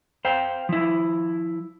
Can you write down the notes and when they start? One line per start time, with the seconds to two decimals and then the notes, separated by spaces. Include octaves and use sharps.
0.25 C5 F5 G5
0.69 F3 E4